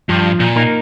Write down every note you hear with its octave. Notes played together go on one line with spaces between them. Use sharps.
G2 F3
A#2
A#3 D#4 A#4